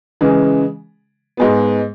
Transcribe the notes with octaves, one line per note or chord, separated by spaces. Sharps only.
C#3 E3 G#3
G#2 G#3 B3